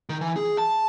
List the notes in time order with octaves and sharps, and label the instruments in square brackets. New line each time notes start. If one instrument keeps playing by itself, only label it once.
[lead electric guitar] D#3
E3
G#4
A5